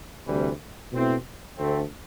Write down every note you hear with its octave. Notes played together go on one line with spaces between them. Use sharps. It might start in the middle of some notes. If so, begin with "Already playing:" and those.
D2 C3 E3 G3
B2 A3 C4 E4
D2 D3 A3 C4